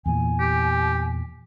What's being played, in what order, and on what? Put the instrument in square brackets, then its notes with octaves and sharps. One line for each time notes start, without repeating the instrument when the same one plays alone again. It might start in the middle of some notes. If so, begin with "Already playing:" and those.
[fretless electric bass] E2 A#2 E3 [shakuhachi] G#5
[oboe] G4